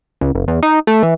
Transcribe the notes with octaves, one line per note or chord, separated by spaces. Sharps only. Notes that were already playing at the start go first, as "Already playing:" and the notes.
C#2
F#1
E2
D#4
A3
E3